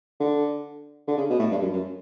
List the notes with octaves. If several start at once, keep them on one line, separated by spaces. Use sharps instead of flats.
D3
D3
C#3
B2
A2
G2
F#2
F#2